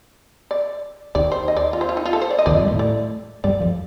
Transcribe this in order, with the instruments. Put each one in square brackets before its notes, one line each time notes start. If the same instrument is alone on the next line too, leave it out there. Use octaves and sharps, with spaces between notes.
[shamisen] D5
[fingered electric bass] D#2 D#3 [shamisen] D5
[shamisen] C5
D#5
D5
F4
C5
F4
D#4
F4
A4
C5
D5
D#5
[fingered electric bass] D#2 D#3 [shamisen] D5
[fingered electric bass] F2 F3
G2 G3
A2 A3
[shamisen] D5
[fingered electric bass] G2 G3 [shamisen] D5
[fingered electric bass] F2 F3